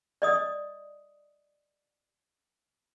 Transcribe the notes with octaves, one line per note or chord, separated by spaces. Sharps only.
D5 D#5 D#6